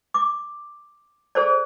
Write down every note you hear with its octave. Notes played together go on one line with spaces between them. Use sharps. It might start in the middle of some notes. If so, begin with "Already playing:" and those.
D6
G#4 A4 C5 D5